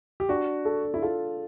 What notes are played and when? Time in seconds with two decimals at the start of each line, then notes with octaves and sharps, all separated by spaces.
0.20 G4
0.29 D4 F#4
0.65 A4
0.94 E4
1.02 F4 A4